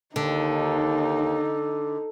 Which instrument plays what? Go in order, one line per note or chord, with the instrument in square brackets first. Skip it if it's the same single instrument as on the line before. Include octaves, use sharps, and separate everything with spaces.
[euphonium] D#2 [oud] D3 [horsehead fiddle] D#4